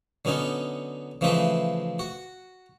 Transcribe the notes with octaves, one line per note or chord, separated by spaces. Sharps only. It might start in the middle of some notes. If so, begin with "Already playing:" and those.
D3 F#3 B3 C#4 D#4
C#3 E3 F3 A3 D#4 B4
F#4